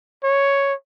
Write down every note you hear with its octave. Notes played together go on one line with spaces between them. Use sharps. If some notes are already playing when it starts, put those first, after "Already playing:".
C#5